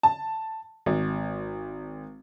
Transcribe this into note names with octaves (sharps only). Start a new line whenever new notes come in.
A5
G#1